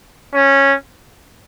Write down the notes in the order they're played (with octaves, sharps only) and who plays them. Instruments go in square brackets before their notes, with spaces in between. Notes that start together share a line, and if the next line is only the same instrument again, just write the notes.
[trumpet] C#4